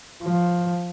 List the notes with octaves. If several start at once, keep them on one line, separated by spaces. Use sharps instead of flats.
F3